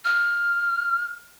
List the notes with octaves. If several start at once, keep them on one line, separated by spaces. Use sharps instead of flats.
F6